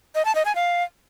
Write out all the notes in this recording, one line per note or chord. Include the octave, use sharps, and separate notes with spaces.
D#5
A5
D#5
G#5
F5